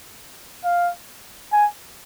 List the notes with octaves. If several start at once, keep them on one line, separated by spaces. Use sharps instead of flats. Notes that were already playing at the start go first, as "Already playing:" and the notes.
F5
G#5